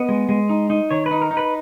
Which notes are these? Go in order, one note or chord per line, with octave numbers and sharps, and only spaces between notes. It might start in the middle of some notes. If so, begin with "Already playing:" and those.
Already playing: B3 D#5
G#3
G#3
D#4
D#4
D#3 C#5
B4
D#4
A#4
D#4
B4